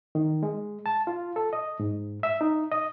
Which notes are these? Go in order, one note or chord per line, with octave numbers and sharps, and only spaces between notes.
D#3
G#3
A5
F4
A4
D#5
G#2
E5
D#4
D#5